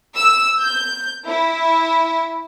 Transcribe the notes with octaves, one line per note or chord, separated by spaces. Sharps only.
E6
G6
E4